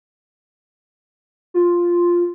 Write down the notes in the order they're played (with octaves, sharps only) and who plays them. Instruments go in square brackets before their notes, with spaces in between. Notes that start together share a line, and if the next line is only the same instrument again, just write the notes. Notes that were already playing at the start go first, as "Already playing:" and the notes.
[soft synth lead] F4